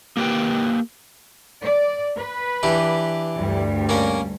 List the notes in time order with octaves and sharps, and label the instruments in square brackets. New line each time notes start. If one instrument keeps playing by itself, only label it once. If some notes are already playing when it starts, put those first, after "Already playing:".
[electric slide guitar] A#3 G4 B4 G5
[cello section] D5
B4
[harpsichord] E3 D4 G4
[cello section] D2 G2 G3
[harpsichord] A#3 C#4 A#4